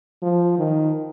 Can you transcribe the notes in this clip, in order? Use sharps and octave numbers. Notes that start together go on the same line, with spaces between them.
F3
D#3